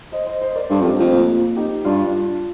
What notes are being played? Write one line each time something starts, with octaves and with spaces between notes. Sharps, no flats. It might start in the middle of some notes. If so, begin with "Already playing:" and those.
C5 D#5
C5 D#5
C5 D#5
A#4 D5
G2 A4 C5
F2 G4 A#4
F2 A3 C4
A#3
D#4 G4
G2 D4 F4